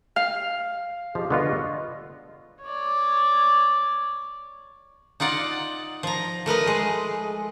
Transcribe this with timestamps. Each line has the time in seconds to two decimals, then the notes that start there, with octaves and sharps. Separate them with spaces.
0.16 F5
1.15 F3 G4 G#4 D#5
1.30 D3 B3 F4 D5 D#5 C#6
2.63 C#5 D5
5.20 D#4 F4 D5 F#5
6.03 F3 A#5
6.46 A3 A#4 B4 D#5
6.66 G#3 A3